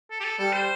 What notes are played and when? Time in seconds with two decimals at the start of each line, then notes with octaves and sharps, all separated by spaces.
0.11 A4
0.21 G4
0.24 A4
0.39 G3 A4
0.53 C5